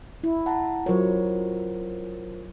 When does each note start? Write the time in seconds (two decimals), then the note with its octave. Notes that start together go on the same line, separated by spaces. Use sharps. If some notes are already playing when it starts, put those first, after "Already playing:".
0.24 E4
0.46 F#5 A5 A#5
0.86 F#3 F4 A#4 C5 C#5